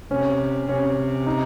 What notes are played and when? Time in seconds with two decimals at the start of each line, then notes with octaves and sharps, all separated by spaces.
0.11 C3 C#4
0.68 C3 C#4
1.26 D#4